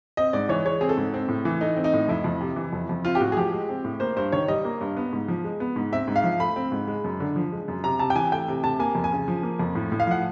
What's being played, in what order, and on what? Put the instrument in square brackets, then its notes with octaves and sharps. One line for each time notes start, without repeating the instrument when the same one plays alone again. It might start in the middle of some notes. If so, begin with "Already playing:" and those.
[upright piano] C4 D#5
G#2 D5
E3 C#5
G#3 C#5
C4 G#4
A4
G#2
C4
A2
E3
A3 D#4
C4
D#4
A2
F2 E4
F2
C3
E3
F2
F2
C4 F4
G4
A2 F#4
G#4
F3 G4
G#3
C4
A2
A#3 C5
G2 C5
D#3 C#5
G3 D#5
A#3
G2
B3
G#2
F3
G#3
B3
G#2
C4 E5
G#2
F5
F3
A3 B5
C4
G#2
G#3
F#2
D3
F3
G#3
F#2
C3 A#5
C3 A5
G5
E3 G#5
A3 G5
C3
C3 A5
A#3 G#5
F2
G#5
C#3
F3
A#3
F2
A2
A2
F5
F3 F#5